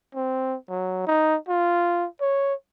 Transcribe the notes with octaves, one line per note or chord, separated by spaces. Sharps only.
C4
F#3
D#4
F4
C#5